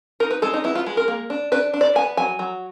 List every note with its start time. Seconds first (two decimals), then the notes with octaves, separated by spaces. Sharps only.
0.20 D#4 A#4
0.31 B4
0.42 G#3 A4
0.54 D#4
0.64 B3 E4
0.75 F4
0.86 G#3
0.97 A#4
1.08 A#3
1.30 D4
1.52 D4 B4
1.74 D4
1.81 D5
1.95 B3 G#5
2.17 F#3 G#5
2.39 F#3